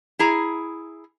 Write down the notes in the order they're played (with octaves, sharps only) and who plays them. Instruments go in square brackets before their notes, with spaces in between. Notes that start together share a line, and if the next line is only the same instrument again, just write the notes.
[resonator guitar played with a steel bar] E4 G#4 A#5